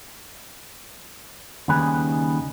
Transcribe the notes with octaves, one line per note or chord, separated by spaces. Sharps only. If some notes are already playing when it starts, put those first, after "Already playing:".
D#2 C#3 G3 D#4 B4 G#5